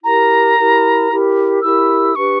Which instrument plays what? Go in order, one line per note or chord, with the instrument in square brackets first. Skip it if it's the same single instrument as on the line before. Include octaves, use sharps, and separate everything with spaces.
[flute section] E4 G4 A#4 [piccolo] A#5
[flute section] E4 G4 A#4
E4 G4 A#4
[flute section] E4 G4 A#4 [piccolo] E6
[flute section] D4 G4 B4 [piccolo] C#6